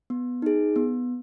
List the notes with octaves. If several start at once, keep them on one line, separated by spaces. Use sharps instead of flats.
B3
D#4 G#4
B3